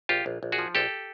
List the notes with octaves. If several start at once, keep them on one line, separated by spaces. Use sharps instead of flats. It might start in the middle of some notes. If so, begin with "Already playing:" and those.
A#1 F4 G4
A#1
A#1
F#4 G#4
F3
A#1 G4 A4